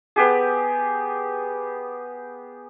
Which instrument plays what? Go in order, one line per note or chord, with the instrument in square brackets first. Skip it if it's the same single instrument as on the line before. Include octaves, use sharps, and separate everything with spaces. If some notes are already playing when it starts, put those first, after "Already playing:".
[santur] B3 G4 G#4